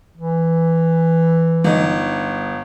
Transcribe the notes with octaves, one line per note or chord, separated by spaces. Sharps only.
E3
G1 D#4